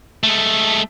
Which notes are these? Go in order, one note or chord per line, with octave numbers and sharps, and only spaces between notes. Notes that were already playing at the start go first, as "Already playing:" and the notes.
G#3 A3